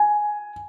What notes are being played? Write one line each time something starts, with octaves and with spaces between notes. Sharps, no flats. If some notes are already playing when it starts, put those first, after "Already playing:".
Already playing: G#5